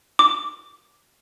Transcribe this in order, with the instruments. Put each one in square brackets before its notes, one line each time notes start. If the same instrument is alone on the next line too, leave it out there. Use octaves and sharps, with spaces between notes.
[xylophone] D6